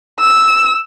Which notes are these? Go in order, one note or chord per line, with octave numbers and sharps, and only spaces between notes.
E6